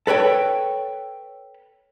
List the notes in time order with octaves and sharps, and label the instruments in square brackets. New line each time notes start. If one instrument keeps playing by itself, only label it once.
[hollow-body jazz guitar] A4 B4 C#5 G5